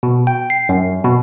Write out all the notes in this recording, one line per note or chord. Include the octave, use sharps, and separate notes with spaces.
B2
G5
C7
F#2
B2